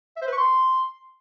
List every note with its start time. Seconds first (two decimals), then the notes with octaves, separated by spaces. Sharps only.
0.16 E5
0.22 C5
0.27 B4
0.32 C#6
0.37 C6